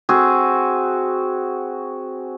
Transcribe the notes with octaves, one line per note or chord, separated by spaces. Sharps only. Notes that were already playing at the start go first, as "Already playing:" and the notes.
C4 F#4 G#4